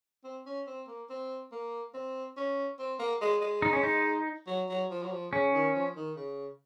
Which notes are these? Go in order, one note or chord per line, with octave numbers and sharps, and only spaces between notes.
C4
C#4
C4
A#3
C4
A#3
C4
C#4
C4
A#3
G#3
G#3
D#4
C#4
D#4
F#3
F#3
F3
F#3
F3
C#3 C#4
D#3
F3
D#3
C#3